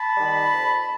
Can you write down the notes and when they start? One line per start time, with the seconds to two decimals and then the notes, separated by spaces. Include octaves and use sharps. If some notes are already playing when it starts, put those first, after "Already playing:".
Already playing: A5 B5
0.16 D#3 G3
0.52 F2